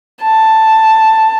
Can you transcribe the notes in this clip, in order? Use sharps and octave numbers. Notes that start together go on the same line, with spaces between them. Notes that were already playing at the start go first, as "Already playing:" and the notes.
A5